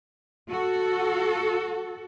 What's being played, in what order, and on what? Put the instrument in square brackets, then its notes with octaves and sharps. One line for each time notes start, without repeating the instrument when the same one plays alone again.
[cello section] F#4 A4